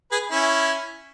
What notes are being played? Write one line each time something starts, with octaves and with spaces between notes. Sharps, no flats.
G#4 B4
C#4 E4